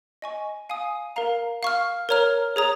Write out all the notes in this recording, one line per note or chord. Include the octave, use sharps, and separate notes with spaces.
D#5 G#5 C#6
F5 G#5 D#6
A#4 F5 A#5
F5 C#6 F6
A#4 C#5 A#5 F6
G#4 C#5 A#5 D#6